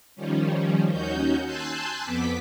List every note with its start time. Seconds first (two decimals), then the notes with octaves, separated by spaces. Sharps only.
0.15 D#3 F3 G3 C#4
0.91 D#2 C#4 D#4 F#4 G6
1.45 G#5 A5 C6 E6 F#6 G6
2.03 F2 B3 D6 B6